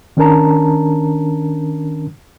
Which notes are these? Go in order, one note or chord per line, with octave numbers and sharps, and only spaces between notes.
D#3 C#4 D4 A#4 A5 A#5